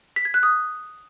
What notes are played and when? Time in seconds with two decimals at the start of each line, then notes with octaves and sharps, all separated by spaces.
0.16 B6
0.25 G#6
0.34 F#6
0.43 D#6